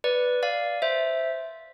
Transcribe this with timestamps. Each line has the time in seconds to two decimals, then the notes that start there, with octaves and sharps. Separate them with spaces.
0.04 B4 D5
0.43 D5 F5
0.82 C5 E5